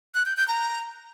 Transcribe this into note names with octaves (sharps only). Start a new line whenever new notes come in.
F#6
G6
G6
A#5